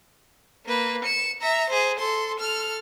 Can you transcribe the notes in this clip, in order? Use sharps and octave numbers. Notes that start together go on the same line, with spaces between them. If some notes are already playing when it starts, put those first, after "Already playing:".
A#3 B4
C#7 E7
E5 A#5
G#4 C5
A4 C6
A4 F6